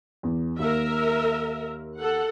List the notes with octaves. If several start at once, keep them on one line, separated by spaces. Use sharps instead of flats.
E2
D#2 A#4 E5
A4 F#5